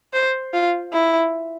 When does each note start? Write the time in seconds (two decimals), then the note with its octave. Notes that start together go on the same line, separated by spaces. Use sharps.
0.13 C5
0.53 F4
0.93 E4